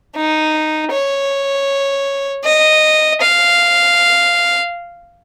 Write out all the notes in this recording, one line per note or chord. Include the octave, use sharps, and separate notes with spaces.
D#4
C#5
D#5
F5